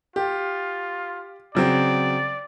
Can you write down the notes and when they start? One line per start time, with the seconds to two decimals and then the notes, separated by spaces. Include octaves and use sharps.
0.16 F4 G4
1.55 C#3 F#3 C4 D5